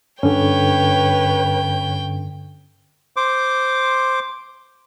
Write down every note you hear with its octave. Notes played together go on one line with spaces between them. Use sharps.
G2 D3 C#4 B4 C#5 G5
C5 D6